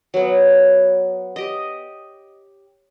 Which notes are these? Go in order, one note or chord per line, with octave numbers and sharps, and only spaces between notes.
F#3 B3
G4 D#5